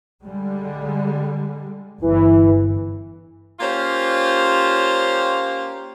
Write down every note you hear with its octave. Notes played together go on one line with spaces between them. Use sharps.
D3 G3 G#3
G1 E3
A#3 C#4 F4 G4 C5